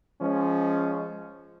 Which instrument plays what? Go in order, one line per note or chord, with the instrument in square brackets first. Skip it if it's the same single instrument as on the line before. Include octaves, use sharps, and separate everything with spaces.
[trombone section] F3 G#3 C#4